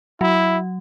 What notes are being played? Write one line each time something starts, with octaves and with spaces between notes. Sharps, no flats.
F#3 E4